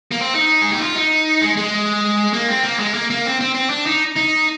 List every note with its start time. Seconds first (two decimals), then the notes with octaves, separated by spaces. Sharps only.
0.11 A#3
0.20 C4
0.35 D#4
0.61 G#4
0.72 G4
0.81 F4
0.96 D#4
1.42 G#3
1.57 G#3
2.34 A#3
2.48 C4
2.64 A#3
2.80 G#3
2.94 A#3
3.10 A#3
3.26 C4
3.41 C4
3.55 C4
3.70 D4
3.87 D#4
4.17 D#4